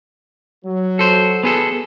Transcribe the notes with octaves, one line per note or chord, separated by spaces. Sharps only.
F#3
A4 C5
B3 G#4 A4